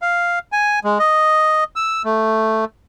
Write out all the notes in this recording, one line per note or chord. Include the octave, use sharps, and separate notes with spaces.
F5
G#5
G#3
D#5
E6
A3